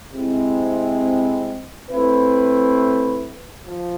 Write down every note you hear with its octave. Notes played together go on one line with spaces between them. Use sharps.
C3 G#3 C4 E4
A3 C4 E4 B4
F3